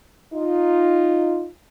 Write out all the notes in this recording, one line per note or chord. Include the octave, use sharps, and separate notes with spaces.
D#4 F4